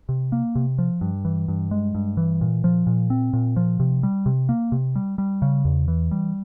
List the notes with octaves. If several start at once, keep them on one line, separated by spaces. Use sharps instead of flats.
C3
A#3
C3
F3
G2
E3
G2
G#3
G2
E3
A#2
F3
A#2
C4
A#2
F3
C3
G3
C3
A#3
C3
G3
G3
C#3
E2
E3
G3